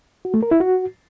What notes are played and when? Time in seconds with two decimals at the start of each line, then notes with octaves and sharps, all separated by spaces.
0.25 F#4
0.34 A3
0.43 A#4
0.51 E4
0.60 F#4